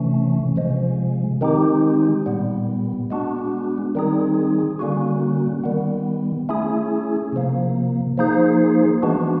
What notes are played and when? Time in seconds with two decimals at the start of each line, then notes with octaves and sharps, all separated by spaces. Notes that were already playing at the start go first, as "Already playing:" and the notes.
Already playing: C3 E3 A3 C#4
0.56 C3 F3 G#3
1.41 D#3 G#3 C4 D#4 G4
2.26 A#2 G3 B3
3.11 G#3 B3 D4 F#4
3.95 D#3 G3 C4 D#4 G#4
4.79 D3 G3 A#3 C#4 F#4
5.64 D#3 G3 B3
6.49 A3 C#4 E4 G#4
7.33 C3 F3 A#3
8.18 F3 A#3 D#4 G#4 C5
9.02 E3 G#3 B3 D4 F#4